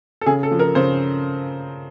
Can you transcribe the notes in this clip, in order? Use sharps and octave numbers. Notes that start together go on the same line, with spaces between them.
A4
C#3 G#4
A4
F3
A#4
C#3 C5